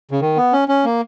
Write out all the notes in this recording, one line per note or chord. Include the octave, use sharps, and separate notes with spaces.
C#3
D#3
B3
C#4
C#4
A#3